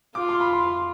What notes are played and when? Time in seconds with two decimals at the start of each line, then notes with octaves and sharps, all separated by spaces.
0.15 F4 D6
0.29 C6
0.40 B5
0.53 C6